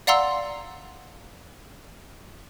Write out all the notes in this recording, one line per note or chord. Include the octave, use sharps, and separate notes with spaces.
D5 F5 F#5 A#5 C6 E6